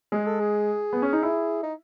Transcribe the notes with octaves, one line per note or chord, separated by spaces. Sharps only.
G#3 G#4
A4
G#4
B3
C#4
D#4
E4
D#4